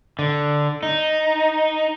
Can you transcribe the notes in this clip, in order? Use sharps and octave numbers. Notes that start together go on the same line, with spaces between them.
D3
D#4